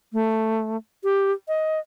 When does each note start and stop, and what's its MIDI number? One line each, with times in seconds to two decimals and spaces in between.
0.13 0.77 57
1.04 1.32 67
1.48 1.80 75